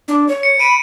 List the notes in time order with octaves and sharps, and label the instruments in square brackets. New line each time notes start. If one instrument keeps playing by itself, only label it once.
[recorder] D4
C#5
[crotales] C#7
[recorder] B5 [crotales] D7 D#7